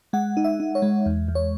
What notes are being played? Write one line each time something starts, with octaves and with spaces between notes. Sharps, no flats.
G#3 F#5
D#4
E5
D#4
C#5
G#3
E2
E2
C#5